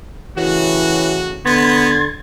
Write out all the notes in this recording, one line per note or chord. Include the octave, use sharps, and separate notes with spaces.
A2 C#3 E3 F#4
D3 B3 C6 G#6 A6